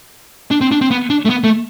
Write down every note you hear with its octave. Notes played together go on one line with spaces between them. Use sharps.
D4
C4
D4
C4
B3
D4
A3
B3
A3